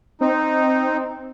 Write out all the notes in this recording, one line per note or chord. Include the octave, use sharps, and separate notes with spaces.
C4 D#4